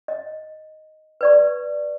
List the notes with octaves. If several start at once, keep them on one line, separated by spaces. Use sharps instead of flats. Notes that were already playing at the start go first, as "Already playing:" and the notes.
D#5
B4 D5 C#6